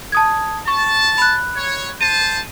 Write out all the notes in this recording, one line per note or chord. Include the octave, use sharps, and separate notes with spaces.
A5 D#6 G#6
A5 C#6
B5 F#6
C#5
C5 A5 D#7